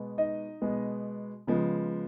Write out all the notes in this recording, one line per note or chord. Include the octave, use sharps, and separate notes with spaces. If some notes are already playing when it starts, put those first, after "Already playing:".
Already playing: B2 G#3 B3
D#4 D#5
B2 G#3 B3
C#3 F3 G#3 B3